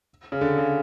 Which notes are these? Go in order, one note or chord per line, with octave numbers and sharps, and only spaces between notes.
C#3
D3
C#3